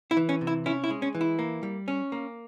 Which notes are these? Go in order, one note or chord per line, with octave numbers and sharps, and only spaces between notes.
E4
E3
C#4
C3
E4
C#4 E4
E4
G#3
C#4
E3
E4
A#3
G3
C#4
A#3